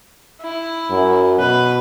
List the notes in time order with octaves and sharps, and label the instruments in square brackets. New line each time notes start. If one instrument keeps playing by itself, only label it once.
[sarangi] E4
[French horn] F#2
[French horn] B2 [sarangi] B4